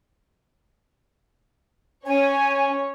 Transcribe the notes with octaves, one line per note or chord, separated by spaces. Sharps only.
C#4 C#5 G#5